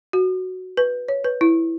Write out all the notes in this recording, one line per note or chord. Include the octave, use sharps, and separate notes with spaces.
F#4
B4
C#5
B4
E4